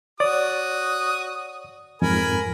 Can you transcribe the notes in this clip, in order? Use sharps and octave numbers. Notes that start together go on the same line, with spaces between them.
F#4 C#5 D5 D#6
F2 G#2 A#4 G#5 B5